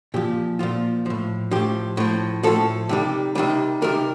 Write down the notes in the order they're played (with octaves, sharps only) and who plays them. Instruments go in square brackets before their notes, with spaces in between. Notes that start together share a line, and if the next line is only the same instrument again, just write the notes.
[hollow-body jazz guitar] A#2 F3 G4
A#2 F3 F4
A2 F3
A2 F3 G4
A2 F3
A2 F3 A4
C3 D#3 G3
C3 D#3 G3
C3 D#3 G3 A#4